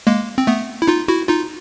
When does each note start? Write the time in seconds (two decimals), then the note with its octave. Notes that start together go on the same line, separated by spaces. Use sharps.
0.07 G#3 A#3
0.38 C4
0.47 A3 B3
0.82 E4
0.88 D#4 F4
1.08 E4 F#4
1.28 D#4 F4